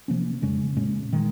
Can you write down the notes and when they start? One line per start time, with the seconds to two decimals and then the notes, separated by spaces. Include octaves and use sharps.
0.08 C3 F3 A#3 C#4
0.42 F2 C#3 G#3 C#4
0.77 A#2 G#3 C#4
1.13 D#3 G#3